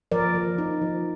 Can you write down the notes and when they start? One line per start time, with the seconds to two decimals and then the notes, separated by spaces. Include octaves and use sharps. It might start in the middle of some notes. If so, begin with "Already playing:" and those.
0.12 F3 A#4 D5
0.35 F3
0.58 D#4
0.82 F3